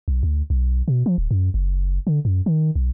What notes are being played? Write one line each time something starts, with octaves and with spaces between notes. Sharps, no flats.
B1
D2
B1
B2
F3
D1
F#2
F#1
D3
F#2
D#3
B1